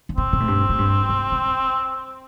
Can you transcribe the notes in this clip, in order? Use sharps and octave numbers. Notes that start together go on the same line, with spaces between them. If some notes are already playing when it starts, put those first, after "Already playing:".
D3
C3 C4
C3
A2
G2
A2
G2
C3
C3